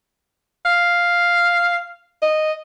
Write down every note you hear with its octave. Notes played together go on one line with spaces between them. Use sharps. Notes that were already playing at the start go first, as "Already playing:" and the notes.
F5
D#5